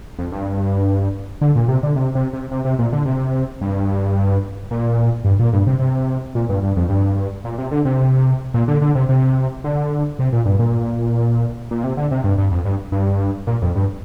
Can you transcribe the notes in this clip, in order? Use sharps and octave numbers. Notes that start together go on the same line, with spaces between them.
F2
G2
D3
A#2
C3
D3
C3
C3
C3
C3
C3
A#2
D3
C3
G2
A#2
G2
A#2
G2
C3
C3
A#2
G2
G2
F2
G2
A#2
C3
D3
C3
A#2
D3
D3
C3
C3
D3
C3
A#2
G2
A#2
A#2
C3
D3
C3
G2
G2
F2
G2
G2
A#2
F2
G2